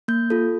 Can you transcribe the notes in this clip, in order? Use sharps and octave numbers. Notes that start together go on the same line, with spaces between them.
A#3 G6
F4 A4